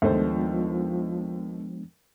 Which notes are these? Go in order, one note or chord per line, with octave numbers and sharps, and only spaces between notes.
D#2 F3 G#3 A3 B3 D4 C5